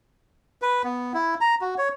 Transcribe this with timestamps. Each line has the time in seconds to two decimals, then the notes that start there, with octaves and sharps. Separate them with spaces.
0.62 B4
0.84 B3
1.14 E4
1.41 A#5
1.61 F#4
1.78 C#5